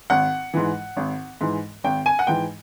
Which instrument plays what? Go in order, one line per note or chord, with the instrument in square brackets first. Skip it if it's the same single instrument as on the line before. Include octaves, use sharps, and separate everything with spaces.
[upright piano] G#1 F#5
G#2 E3
G#1
G#2 E3
G#1 G5
G#5
F#5
G#2 E3 G5